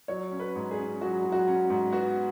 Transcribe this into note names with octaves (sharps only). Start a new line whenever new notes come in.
F#3 C#5
C#4
B4
G#2
G#4
C#4
F#3 F#4
F#3
F#4
C#4
G#2
B3 F#4